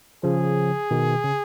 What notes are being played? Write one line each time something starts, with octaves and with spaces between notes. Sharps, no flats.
C#3 F3 G#4
B2 D#3
C#3